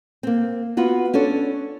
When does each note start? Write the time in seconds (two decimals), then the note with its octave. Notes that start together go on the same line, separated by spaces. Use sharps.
0.23 A#3 C4
0.77 B3 F4 F#4
1.14 C#4 D4 A4 C#5